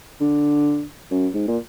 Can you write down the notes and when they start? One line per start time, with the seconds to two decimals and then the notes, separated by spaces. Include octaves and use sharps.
0.21 D3
1.11 F#2
1.34 G#2
1.47 A#2